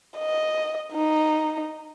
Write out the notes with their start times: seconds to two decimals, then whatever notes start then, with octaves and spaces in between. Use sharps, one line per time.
0.18 D#5
0.93 D#4